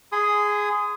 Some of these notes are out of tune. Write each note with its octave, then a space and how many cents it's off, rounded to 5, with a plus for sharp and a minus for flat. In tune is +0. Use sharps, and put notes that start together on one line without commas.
G#4 +0 C6 -40 D#6 +0